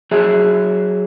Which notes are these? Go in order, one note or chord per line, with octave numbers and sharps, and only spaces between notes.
F#3 G#4 E5